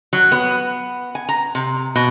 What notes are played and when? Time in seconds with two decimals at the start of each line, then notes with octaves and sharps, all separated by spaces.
0.13 F#3
0.32 B3
1.15 G#5
1.29 A#5
1.55 C3
1.96 B2